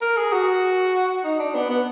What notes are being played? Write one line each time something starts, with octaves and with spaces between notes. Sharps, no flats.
A#4
G#4
F#4
D#4
D4
B3
B3